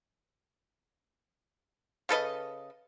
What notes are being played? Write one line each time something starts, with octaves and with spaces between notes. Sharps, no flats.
C#3 A4 B4 D#5